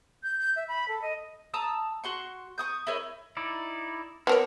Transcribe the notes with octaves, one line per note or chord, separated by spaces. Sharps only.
G6
G6
E5
B5
A4
D#5
A5 A#5 D#6 E6
F#4 C6 C#6
C#6 D#6 G6
E4 A#4 C#5 D#5
D#4 E4 D5
B3 E4 A4 A#4 C#5 D5